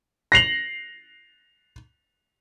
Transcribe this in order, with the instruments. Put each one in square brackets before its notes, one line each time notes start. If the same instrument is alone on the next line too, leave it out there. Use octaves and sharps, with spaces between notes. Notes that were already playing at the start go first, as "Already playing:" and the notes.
[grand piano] A#6 C7 F7 F#7